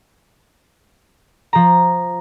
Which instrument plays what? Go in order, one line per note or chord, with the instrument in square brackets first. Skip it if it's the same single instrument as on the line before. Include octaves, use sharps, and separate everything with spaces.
[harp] F3 A#5